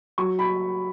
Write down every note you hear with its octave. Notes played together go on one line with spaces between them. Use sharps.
F#3 C#6
B5